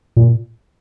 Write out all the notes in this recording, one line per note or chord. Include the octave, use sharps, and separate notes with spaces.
A#2